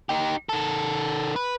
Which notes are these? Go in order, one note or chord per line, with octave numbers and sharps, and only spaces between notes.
D#4 G4
D#3 A4
B4